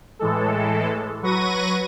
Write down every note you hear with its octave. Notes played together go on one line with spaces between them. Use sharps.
A2 E3 G#3 A4
F#3 B4 C#6 A#6 D#7